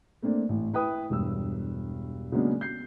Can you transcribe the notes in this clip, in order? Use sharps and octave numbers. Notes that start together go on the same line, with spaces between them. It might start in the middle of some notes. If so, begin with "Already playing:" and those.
A3 A#3 C4 D4
A1
E4 B4 G5 D#6
E1 G2 E6
C#3 F#3 G#3 A#3 B3 D4
G6 C7